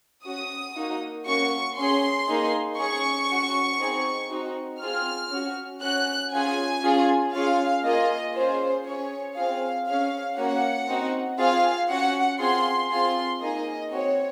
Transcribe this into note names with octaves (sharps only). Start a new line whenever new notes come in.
C#4 F#4 D#6
A#3 D#4 F#4
A#3 C#4 F#4 C#6
C#4 G#4 C6
A#3 D#4 G#4
C#4 G#4 C#6
C#4 F#4
C4 D#4 G#4
C4 D#4 F#4
C4 F4 G#4 F6
C#4 F#4
C#4 F#4 F#6
C#4 F4 G#4 G#5
C#4 F4 G#4
C#4 F4 G#4 F5
A#3 F4 G#4 D#5
C#4 F4 G#4 C5
C#4 G#4 C#5
C4 F4 G#4 F5
C#4 G#4 F5
A#3 C#4 F#4 F#5
C4 D#4 F#4
C4 F4 G#4 F5
C#4 F#4 F#5
C4 F4 G#4 C6
C4 F4 G#4 C6
A#3 D#4 G#4 D#5
C4 F#4 C#5